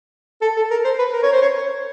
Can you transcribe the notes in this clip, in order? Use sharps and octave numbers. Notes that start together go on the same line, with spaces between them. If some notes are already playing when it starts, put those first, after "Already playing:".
A4
A4
A#4
C5
B4
A#4
C#5
C5
C#5